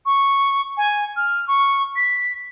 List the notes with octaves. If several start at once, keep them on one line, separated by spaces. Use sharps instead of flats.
C#6
G#5
F6
C#6
B6